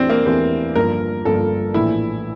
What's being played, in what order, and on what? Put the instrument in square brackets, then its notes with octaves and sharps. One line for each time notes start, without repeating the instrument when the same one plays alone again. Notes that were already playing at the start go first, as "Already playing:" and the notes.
Already playing: [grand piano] E2 E3 A3 E4 G4 [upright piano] C4 D4
[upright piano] A#3
[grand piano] E2 E3 A3 E4 G4 [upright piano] C4
[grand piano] G1 G2 F3 A#3 [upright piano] A#4
[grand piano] G1 G2 F3 A#3 [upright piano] A4
[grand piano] A#1 A2 E3 [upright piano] E4